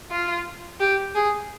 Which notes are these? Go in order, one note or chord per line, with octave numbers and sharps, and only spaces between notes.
F4
G4
G#4